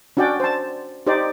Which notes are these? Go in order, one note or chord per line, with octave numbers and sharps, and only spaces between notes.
C#4 D4 F#4 D5 G5
C5 A5
D#4 G4 C5 D5